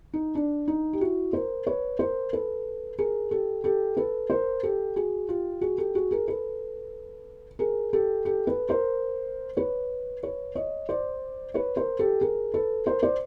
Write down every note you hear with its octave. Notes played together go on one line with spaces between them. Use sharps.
D#4
D4
D#4
G4
E4 F#4
A#4 C5
B4 C#5
A#4 C5
A4 B4
G#4 A#4
G4 A4
G4 A4
A4 B4
A#4 C5
G4 A4
F#4 G#4
F4 G4
F#4 G#4
G4 A4
F#4 G#4
G#4 A#4
A4 B4
G#4 A#4
G4 A4
G4 A4
A4 B4
A#4 C5
B4 C#5
B4 C#5
C#5 D#5
C5 D5
B4 C#5
A#4 C5
G4 A4
G#4 A#4
A4 B4
A#4 C5
C5 D5